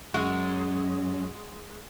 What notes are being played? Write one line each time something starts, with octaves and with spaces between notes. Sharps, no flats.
F#2 G#3 F#4